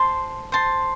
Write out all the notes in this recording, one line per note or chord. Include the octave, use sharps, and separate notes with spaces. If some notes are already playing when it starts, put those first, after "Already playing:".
Already playing: C5 A5 C6
C5 A5 C6